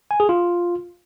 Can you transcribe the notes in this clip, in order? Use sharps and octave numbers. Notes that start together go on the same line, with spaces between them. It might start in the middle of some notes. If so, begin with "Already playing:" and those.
G#5
G#4
F4